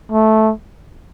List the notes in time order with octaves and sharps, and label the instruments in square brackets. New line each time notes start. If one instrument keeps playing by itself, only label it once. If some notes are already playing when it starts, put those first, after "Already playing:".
[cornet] A3